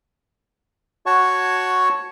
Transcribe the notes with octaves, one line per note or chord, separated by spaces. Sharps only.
F#4 C#5 F#5 A5 C#6